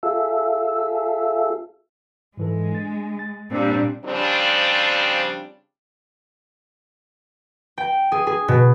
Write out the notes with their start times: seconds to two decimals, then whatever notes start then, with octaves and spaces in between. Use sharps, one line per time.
0.03 F4 G#4 A4 E5
2.37 G#2 E3 G#3 A4
2.72 D4 A6
3.19 A6
3.50 A#2 G3 C4 D4
4.04 C#3 F3 G3 C4 D4
7.78 G5
8.12 G#4
8.27 G#4
8.48 B2